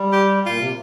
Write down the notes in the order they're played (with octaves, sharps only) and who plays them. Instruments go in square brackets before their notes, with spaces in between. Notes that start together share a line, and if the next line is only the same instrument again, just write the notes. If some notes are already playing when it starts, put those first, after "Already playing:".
Already playing: [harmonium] G3
[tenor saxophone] G4
[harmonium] A#2 [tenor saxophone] F4
[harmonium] C3